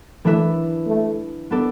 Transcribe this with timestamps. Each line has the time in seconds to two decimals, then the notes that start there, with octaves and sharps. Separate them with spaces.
0.25 E3 A3 D4 B4 E5
0.87 A3
1.51 B3 D4 A4 D5